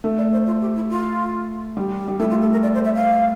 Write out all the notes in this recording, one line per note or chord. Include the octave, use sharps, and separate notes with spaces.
A3
D5
C5
F4
G4
E4
F4
G3
G3
A3 E4
F4
A4
A#4
D5
C5
E5
F5